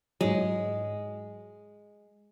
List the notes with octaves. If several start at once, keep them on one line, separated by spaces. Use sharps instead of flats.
G#2 F#3 G#3